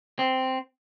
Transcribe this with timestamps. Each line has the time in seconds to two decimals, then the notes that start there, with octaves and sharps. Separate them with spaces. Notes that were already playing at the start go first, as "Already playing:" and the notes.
0.19 C4